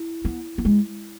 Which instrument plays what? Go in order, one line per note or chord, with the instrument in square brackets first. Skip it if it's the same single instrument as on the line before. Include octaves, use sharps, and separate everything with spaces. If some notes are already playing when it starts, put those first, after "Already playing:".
Already playing: [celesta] E4
[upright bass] B3
B3
G#3